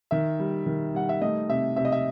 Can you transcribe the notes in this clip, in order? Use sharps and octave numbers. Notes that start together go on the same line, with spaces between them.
D#3 E5
G3
D#3
G3 F#5
E5
A3 D#5
C3 E5
C3 E5
D#5
E5